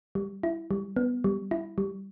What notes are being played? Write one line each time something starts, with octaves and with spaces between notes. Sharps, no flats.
G3
E4
G3
B3
G3
E4
G3